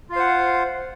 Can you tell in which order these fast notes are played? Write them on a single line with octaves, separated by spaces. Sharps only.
F4 F5 C5 F#5